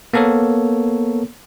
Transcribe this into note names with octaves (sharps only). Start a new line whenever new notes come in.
A#3 B3 A4 A#4 C#5